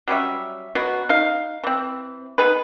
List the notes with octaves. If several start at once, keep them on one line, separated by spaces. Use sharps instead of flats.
F#3 G3 C#4 E5
B2 F#3 F#4
D#4 F5
E3 C4
B3 D#4 G#4 B4